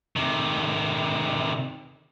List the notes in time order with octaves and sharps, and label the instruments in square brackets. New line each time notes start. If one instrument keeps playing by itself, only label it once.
[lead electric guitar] C3 D#3